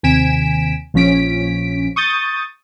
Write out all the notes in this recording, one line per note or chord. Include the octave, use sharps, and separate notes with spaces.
D#2 C3 G#5 B6 D7 E7
A#1 F3 C#4 B6 D7
C#6 D#6 G6 A6